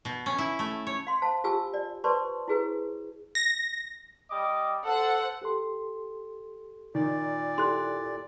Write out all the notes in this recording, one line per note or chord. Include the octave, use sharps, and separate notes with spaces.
B2
C#4
E4
A3
C#5
F5 C6
C5 F5 A5
F4 G4 G#5 A5 E6
D5
B4 C5 D5 A5 C6 C#6
E4 F#4 G#4 B4
A#6
G3 D#5 D6
A4 C5 F#5
G4 A4 C6
A#2 D#3 D5
E4 G4 A4 C6 F#6